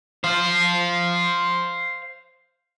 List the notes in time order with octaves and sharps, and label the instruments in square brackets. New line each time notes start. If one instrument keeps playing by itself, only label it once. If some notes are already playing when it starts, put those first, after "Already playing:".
[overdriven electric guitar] C5 F5